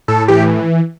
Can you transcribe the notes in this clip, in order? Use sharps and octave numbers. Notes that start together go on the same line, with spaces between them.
A2 A4
E3 G4